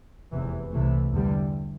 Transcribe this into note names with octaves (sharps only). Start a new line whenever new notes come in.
F1 E2 C3 E3
C2 C3 E3 A3
E2 D3 G3